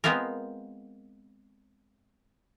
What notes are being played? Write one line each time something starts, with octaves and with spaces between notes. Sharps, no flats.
G#3 B3 C4 F4 A#4